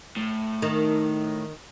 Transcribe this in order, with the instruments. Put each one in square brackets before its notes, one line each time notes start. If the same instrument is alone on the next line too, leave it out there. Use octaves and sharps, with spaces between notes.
[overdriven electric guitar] A2
[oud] D#3